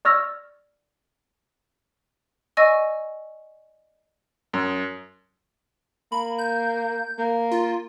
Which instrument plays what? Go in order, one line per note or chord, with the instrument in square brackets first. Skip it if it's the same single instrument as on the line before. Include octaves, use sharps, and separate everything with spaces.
[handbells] D5 C#6 E6 F6 G#6 A#6
[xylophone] D5 D#5 G#5 C#6 E6
[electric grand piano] F#2
[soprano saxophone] A#3 [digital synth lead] B5
[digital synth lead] G6
[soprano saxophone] A#3
[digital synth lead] F4